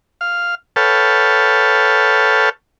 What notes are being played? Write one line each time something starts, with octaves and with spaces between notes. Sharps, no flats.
F5
A4 B4 C#5 F5 G5 A5